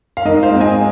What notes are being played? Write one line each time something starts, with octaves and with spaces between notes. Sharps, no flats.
F5
G#2 A#4 D#5
C5 F5
G#3 C4
D#5 G#5